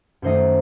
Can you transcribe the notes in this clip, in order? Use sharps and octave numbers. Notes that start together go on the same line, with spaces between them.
F#2 D#3 A3 D#4 C5 D#5